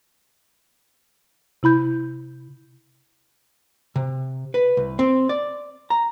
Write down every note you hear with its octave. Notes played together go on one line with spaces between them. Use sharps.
C3 E4 B5 G6
C3
B4
C2
C4
D5
A#5